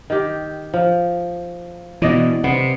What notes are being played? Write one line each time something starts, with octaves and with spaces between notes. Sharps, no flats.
D#3 G4
F3
B2 E3 D5 D#5
C3 B3